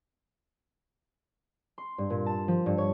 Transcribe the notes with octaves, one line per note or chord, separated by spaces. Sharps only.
C6
G2
A#2
A5
F3
G2
C#5